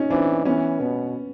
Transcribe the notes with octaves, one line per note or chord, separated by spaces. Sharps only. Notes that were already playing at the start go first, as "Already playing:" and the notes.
Already playing: C#4 D#4
E3 C4 D4
E3 B3 C#4
B2 B3